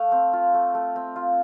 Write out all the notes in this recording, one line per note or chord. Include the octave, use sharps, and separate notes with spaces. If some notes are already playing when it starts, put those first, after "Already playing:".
Already playing: A3 F5
C4
F4
A3
A3
C4
F4